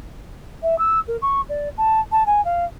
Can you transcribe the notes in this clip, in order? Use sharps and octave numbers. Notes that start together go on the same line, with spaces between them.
E5
E6
A#4
C#6
D5
A5
A5
G#5
F5